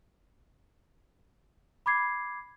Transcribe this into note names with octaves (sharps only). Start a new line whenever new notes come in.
B5 D6 G#6 C7